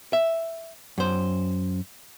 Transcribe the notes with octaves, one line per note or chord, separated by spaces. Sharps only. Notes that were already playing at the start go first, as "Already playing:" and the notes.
E5
F#2 C5